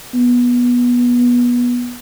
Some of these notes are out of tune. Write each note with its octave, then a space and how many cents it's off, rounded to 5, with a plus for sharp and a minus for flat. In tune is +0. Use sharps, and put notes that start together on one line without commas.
B3 -20